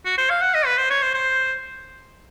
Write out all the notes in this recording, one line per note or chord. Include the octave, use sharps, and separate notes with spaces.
F#4
C5
F5
F#5
D#5
B4
C5
C#5
C5
C5